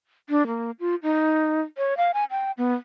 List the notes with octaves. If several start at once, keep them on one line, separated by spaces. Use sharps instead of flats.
D4
A#3
F4
D#4
C#5
F5
G#5
G5
B3